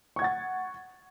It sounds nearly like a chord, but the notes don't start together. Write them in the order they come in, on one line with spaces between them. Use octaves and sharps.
C#6 G#6 F#5 A6